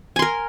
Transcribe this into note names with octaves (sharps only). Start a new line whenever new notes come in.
A#4 G#5 C6